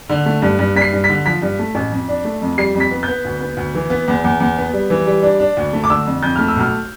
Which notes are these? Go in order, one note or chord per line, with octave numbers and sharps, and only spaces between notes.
D3
A3
G2
G2
G2 B6
C7
G2
B6
D3
F3 B6
G2
A3
A1
F2
D4
A3
F2
G3 C7
F2
B6
B3
G6
B3
D2
B3
D2
E3
B3
E2
E2
E2
B3
G3
E3
G3
D4
D4
D2
A3
D6
D3 E6
F2
F2 G6
A3 F6
E6
B1 F6